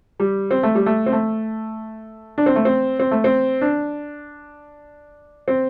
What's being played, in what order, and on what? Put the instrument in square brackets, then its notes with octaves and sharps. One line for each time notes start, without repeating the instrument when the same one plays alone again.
[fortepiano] G3
C4
A3
G3
A3
C4
A3
D4
C4
A3
C4
C4
A3
C4
D4
C4